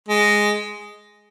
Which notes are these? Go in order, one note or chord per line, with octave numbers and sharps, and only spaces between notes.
G#3